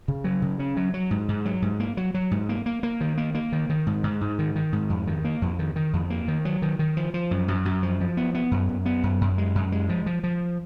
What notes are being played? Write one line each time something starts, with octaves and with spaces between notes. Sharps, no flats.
C#3
F#3
C#3
C#4
F#3
F#3
G#2
G#2
F#3
G#2
A#3
F#3
F#3
G#2
A#3
A#3
A#3
D#3
A#3
A#3
D#3
D#3
G#2
G#2
G#2
D#3
D#3
G#2
F2
D#3
A#3
F2
D#3
D#3
F2
A#3
D#3
F#3
D#3
D#3
F3
F3
F#2
F#2
F#2
F3
F3
B3
B3
F#2
F#2
B3
F#2
F#2
G#3
F#2
G#3
F3
F3
F3